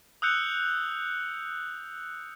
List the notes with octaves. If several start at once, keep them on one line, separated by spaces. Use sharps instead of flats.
D#6 E6 F#6 G6 C#7 F7